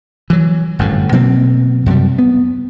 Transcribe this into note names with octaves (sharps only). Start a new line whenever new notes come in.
E3 F#3
G1 F#2 A2
B2 F#3 A#3 C4
F#2 C3 F#3 G3
B3